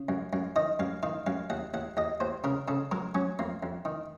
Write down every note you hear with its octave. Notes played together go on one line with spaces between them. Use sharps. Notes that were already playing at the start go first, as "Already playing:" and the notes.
Already playing: C#3
F#2
F#2
D#3 D#5
F#2 F5
D#3 F5
F#2 F5
D#2 F#5
D#2 F#5
D#2 D#5
D#2 C5
C#3 A#4
C#3 A4
F#3 A#4
F#3 C#4
F2 A#3
F2
D#3